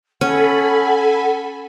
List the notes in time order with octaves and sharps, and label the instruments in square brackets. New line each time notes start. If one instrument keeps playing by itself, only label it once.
[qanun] C#4 [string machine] A4 G#5 B5 [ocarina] F#5